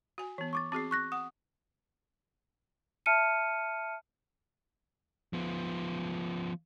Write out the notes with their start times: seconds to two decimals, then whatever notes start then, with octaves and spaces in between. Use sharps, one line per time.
0.18 F#4 G#5
0.38 E3 B3
0.53 C#6 D6 A6
0.72 C4 F#4 G#4 D6 C7
0.91 C#6 F#6 A#6
1.12 F#5 D#6
3.06 E5 A5 F6 C#7 D#7
5.33 F3 B3